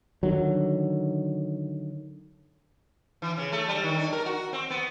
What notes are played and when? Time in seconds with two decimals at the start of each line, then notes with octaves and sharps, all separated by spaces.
0.23 D3 D#3 F#3
3.22 E3
3.37 C#3
3.52 A3
3.69 G3
3.84 D#3
3.98 D4
4.13 A#4
4.26 F#4
4.53 C4
4.70 B3